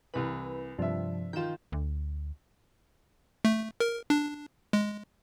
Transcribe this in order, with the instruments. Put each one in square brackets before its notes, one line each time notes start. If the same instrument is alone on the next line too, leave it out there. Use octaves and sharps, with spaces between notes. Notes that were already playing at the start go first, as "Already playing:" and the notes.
[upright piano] C2 E3 [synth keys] B4
[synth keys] G2 C3 F3 [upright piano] D4 E5
[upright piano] D#3 F4 [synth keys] G5 E7
[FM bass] D2
[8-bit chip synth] A3
A#4
D4
G#3